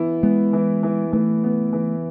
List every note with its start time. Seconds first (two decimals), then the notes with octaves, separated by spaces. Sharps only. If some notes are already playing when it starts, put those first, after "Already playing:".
Already playing: E3 B3 E4
0.23 G#3 B3
0.53 E3
0.83 E3
1.13 E3 A3
1.44 B3
1.73 E3